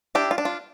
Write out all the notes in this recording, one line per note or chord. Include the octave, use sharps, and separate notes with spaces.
D4 E4 G4
F4
D4
F4